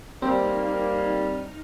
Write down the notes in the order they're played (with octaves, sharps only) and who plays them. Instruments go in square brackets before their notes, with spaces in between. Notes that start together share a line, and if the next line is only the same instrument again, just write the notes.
[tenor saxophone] G3 [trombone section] A#3 [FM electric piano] C4 [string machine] D#4 F6